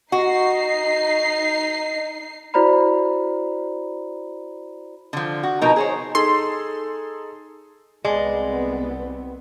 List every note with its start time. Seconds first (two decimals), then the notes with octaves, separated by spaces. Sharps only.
0.12 D#4 F#4 D#5 C7
2.54 E4 F#4 C5 D5 A#5 B5
5.13 D3 F3
5.43 F#4
5.61 B2 F3 D#4 A#4
5.76 G#4 C5 C#5
6.15 D#4 G#4 A4 C6
8.05 C2 G#3 B3 C4 D5